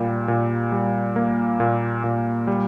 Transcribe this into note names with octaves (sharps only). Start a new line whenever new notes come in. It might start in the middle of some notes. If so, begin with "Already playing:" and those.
Already playing: A#2 G3 A#3
A#2
G3
A#3
A#2
A#2
G3